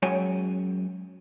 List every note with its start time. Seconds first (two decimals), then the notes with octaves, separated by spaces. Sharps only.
0.02 F#2 G#3 C#5 G5 G#5